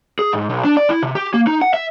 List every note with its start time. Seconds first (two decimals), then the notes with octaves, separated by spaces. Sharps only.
0.19 G#4
0.33 G#2
0.50 B1
0.64 D4
0.77 D5
0.90 E4
1.03 C3
1.15 G4
1.34 A#3
1.47 D#4
1.62 F#5
1.74 E5